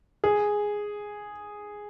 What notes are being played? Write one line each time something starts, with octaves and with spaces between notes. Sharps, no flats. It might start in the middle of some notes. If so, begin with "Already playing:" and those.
G#4